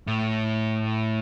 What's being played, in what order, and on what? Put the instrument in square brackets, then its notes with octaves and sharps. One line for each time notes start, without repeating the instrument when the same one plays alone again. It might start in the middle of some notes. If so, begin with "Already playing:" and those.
[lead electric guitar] A2